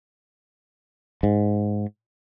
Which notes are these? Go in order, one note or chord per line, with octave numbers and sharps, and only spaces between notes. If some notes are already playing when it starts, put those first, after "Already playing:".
G#2